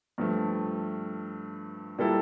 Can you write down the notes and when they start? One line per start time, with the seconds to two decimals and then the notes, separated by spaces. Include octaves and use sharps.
0.18 G2 F3 A3
1.98 A#2 G3 A#3 E4 A4